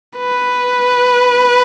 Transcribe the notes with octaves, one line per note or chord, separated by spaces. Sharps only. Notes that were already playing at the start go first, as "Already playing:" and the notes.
B4